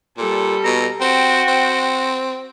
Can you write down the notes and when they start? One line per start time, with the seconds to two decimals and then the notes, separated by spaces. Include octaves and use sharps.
0.18 A#2 G3 A4
0.64 B2 A#5
1.01 C4 F#4 G5
1.48 C4